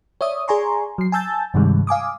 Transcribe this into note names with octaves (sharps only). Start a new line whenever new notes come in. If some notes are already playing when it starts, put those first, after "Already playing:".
C#5 D5 E5 D#6
G#4 D5 G#5 A#5 C6 C#6
F#3 C7
G#5 A5 E6 G6 A6
G2 C3 D#3 G3 G#3
F5 G#5 D6 D#6